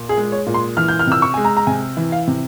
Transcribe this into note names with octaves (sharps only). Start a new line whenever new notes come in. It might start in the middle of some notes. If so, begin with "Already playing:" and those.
Already playing: A#2
G#4
G#3
C#5
A#2
C6
E3 F6
G6
F6
C3 E6
C#6
G#3 G#5
A#5
A#5
C3 G#5
E3
F5
C3